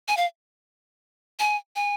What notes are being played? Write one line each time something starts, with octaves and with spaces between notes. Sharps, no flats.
G#5
F5
G#5
G#5